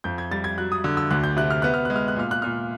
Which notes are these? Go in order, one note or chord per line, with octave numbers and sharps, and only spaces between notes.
F2 G6
G#6
G3 A6
G#6
F#3 F#6
D#6
D3 E6
E6
D2 F#6
G6
C3 F#6
F6
B3 F#6
F6
G#3 F#6
F6
F#6
A#2 F6
F#6
A#2 F6